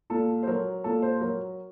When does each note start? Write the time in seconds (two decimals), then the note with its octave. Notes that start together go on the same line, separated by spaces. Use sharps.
0.10 A#2 A4
0.43 C5
0.47 F#3 A#4
0.84 A#2 A4
1.02 C5
1.21 F#3 A#4